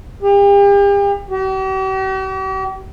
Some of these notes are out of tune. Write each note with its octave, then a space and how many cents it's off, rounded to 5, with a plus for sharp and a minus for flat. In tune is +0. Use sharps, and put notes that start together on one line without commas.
G4 +40
G4 -45